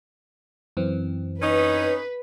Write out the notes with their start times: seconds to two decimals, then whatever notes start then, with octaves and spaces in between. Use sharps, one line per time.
0.77 F#2 E3 C4
1.42 C#4 D#4 B4